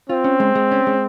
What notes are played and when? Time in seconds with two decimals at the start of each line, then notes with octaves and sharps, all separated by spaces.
0.09 C4 F4
0.24 C#4
0.40 G#3
0.55 G#3
0.71 C#4
0.87 G#3